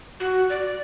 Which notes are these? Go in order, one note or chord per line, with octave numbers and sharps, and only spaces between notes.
F#4
D5